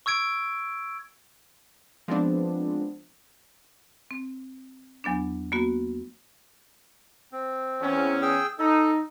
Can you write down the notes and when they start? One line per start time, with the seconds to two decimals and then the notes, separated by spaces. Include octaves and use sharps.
0.06 C#6 E6 G#6 D7
2.08 F3 G#3 B3 C4 D4
4.11 C4
5.04 E2 F#3 B3 D4
5.52 A#3 B3 F#4
7.32 C4
7.81 E2 C#4
8.22 G#4 G5 E6
8.59 D#4 A4